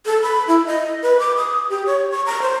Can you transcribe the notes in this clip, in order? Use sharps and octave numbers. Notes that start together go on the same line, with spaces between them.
A4
B5
E4
D#5
B4
D6
D#6
G4
C#5
C#6
A#5
C5